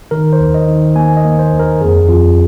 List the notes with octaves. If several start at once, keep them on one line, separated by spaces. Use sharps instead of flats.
D#3 A#4
C5
D#2
D#5
D#3
A#3 G#5
D#5
A#3
C5
D#2
A#4
F2 G#4
F2 F4